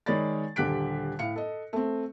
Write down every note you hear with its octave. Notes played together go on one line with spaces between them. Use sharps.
D#3 G#3 C#5 D5 B5 A6
D#1 D3 G4 F#6 B6 D7
A2 F5 C#7
A4 D#5
A3 C4